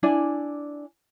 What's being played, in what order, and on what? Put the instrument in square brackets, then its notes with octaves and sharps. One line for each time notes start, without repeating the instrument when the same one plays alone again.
[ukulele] D4 E4 D5 G#5